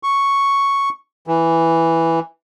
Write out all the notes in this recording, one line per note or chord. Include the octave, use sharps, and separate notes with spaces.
C#6
E3